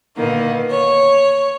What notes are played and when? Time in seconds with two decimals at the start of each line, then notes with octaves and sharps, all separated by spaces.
0.17 A#2 D3 D#3 A#3 B3
0.70 C#5